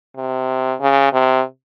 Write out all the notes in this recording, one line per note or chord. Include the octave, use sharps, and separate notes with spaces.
C3
C#3
C3